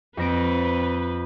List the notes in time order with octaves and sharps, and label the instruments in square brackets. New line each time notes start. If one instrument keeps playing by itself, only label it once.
[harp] F2 A#6 D7 [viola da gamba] C4 B4